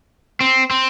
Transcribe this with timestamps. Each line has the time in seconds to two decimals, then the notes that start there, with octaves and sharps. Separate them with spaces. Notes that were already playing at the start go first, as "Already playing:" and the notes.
0.41 C4
0.71 C4